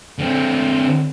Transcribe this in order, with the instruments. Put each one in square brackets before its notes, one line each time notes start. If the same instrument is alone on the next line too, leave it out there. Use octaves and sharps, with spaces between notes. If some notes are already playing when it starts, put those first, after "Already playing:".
[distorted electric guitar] D3 C4